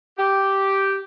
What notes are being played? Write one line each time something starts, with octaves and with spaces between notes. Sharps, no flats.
G4